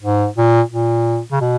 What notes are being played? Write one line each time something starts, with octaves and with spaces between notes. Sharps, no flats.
G#2
A#2
A#2
C#3
B2